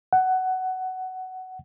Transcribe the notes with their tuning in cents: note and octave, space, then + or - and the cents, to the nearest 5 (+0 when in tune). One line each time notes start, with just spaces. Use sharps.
F#5 +15